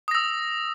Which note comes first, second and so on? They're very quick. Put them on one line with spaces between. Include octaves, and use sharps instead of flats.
D#6 A#6 E6